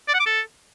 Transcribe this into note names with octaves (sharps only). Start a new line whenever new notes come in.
D5
F#5
D6
A4